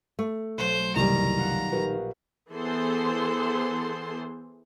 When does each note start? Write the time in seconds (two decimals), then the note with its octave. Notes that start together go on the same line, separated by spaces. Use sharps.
0.19 A3
0.58 B1 F#3 C5
0.96 F#1 C2 D#3 G3 A#5
1.37 F4 F#5
1.72 A#1 G4 A#4 B4
2.50 E3 B3 G#4 A4 C5 C6